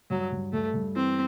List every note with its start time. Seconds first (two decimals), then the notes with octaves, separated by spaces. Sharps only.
0.10 G2 F#3
0.32 G2
0.53 G2 A3
0.74 G2
0.95 E3 C4